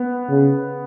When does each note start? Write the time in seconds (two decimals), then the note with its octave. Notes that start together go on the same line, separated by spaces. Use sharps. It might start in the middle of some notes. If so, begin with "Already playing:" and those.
Already playing: B3
0.29 C#3